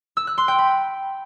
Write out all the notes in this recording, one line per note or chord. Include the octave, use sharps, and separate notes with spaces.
E6
F#6
C6
G5
B5